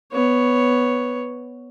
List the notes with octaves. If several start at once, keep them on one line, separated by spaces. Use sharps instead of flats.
B3 C#5